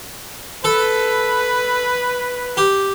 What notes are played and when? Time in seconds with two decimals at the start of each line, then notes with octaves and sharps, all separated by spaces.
0.64 A4 B4
2.57 G4